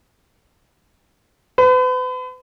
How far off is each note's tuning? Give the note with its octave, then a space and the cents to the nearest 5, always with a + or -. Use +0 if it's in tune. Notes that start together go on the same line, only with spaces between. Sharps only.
B4 +40